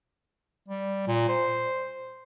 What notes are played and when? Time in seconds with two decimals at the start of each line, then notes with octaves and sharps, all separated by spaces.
0.68 G3
1.07 A#2
1.29 C5